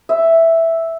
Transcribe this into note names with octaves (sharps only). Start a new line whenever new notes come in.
E5